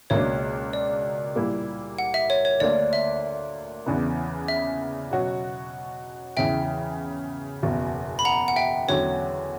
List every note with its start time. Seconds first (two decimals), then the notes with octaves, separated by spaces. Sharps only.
0.10 C#2 B2 A#3 D4 C#5
0.73 D5
1.36 A#2 G3 A#3 E4
1.99 F#5
2.14 E5
2.30 C#5
2.45 C#5
2.60 D2 D3 A#3 D5
2.93 E5
3.86 E2 C#3 E3 B3 D4
4.48 E5
5.11 B2 F#3 C#4 F#4
6.37 E2 C#3 E3 E5 G5
7.62 F#1 E2 B2
8.19 B5
8.25 F#5 A#5
8.48 F#5
8.56 E5 G5
8.88 E2 D3 F#3 C#4 F#4 C#5